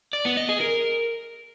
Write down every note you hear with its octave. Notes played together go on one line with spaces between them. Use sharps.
D5
B3
D#5
G#4
A#4